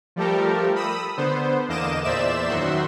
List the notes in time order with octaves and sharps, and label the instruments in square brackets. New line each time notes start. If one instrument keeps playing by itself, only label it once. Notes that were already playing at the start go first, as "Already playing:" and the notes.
[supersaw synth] F3 G3 A3 G4 A4 A#4
B5 D#6 E6
D3 B3 C5
E2 D3 A#3 D#5 D6 E7
E2 A#2 C5 D5 E5 E7
F#2 D#3 F#4 E5 C6